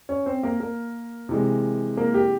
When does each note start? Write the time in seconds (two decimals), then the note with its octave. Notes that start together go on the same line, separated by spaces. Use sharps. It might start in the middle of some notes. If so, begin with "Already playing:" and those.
0.09 C#4 C#5
0.26 C4 C5
0.43 A#3 A#4
0.60 A#3 A#4
1.29 C3 E3 G#3
1.97 A#3 A#4
2.14 G4